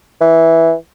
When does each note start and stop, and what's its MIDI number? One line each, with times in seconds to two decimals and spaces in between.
0.21 0.73 52